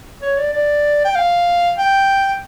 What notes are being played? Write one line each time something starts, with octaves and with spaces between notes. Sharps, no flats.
C#5
D5
D5
G5
F5
G5